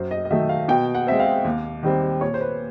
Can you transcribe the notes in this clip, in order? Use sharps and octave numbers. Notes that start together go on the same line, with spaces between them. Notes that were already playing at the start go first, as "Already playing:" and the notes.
Already playing: F#2 C5
D#5
D#5
D#3 F#3 A3 E5
F5
B2 G5
F#5
G#3 C4 E5
F5
D#2
D#3 G3 C4
A#2 C#5
C5
B4